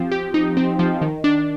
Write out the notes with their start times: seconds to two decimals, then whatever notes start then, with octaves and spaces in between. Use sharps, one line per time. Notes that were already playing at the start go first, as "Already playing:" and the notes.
Already playing: F3 C4 G4
0.12 G4
0.34 D#4
0.57 C4
0.79 F3
1.02 D#3
1.24 D4